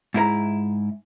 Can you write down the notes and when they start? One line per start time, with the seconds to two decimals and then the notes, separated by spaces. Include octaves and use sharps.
0.14 G#2 E4 A#4 A#5